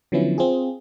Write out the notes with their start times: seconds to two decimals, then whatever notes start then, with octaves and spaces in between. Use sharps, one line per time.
0.12 D3 F3 F#3 B3 C#4 E4
0.38 C4 F4 G#4